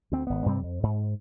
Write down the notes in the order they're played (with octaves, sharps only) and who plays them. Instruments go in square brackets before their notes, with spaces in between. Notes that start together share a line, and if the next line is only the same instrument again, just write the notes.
[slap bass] D2 C4
G#1 B3
G2 C3 G3 C4
F2
G#2